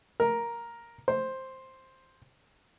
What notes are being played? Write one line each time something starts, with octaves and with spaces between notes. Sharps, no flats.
A#4
C5